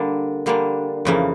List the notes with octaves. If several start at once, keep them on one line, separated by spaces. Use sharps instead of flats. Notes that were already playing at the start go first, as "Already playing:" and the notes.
Already playing: D3 G3 A#3 D4
D3 G3 A#3 D4
F2 C#3 E3 A#3